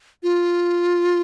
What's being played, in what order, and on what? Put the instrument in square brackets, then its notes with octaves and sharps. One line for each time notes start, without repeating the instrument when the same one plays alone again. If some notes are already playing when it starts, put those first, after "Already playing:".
[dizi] F4